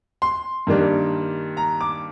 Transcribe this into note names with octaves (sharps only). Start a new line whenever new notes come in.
C6
G2 D#3 G3 A#3 D4
A#5
D6